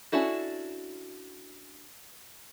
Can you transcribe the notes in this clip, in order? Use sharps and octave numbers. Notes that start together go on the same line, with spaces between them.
C#4 D4 E4 F#4 A4